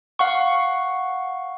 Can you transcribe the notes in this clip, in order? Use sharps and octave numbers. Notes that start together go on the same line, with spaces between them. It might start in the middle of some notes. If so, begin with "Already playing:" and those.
F5 F#5 C#6